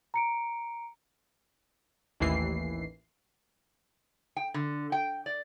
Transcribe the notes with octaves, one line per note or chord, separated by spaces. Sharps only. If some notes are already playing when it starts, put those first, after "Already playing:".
A#5 C#7 D7
A1 D#2 E3 C7
G5
D3
G5
D5